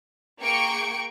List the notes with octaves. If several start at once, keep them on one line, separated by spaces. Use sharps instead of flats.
A#3 G#4 G5 C#6 C#7 D7